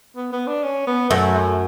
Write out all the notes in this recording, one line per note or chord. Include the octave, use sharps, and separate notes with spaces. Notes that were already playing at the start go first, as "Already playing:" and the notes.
B3
B3
D4
C#4
B3
F#2 A3
A3